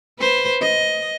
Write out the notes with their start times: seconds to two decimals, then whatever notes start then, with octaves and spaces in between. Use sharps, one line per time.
0.19 B4 C5
0.61 D#5